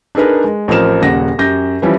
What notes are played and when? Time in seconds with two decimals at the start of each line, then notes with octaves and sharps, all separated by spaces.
0.15 D4 D#4 G#4 A#4 B4
0.44 G#3
0.68 A1 F3 C4 A#4 F6 E7
1.01 D#1 A#2 C#3 F#5 A#6
1.38 F#2 G4 G6 A#6
1.82 E3 F3 G3 C#4 E4